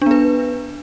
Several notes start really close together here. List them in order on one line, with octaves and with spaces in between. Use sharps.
D4 B3 B4